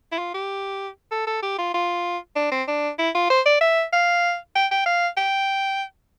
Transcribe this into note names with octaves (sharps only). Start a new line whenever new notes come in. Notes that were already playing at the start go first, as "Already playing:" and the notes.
E4
F4
G4
A4
A4
G4
F4
F4
D4
C4
D4
E4
F4
C5
D5
E5
F5
G5
G5
F5
G5